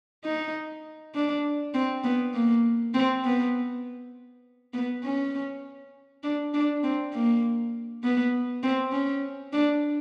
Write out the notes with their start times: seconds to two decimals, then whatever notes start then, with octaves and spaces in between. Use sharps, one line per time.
0.25 D#4
1.15 D4
1.74 C4
2.04 B3
2.34 A#3
2.94 C4
3.25 B3
4.73 B3
5.04 C#4
6.23 D4
6.54 D4
6.83 C4
7.13 A#3
8.03 B3
8.63 C4
8.92 C#4
9.53 D4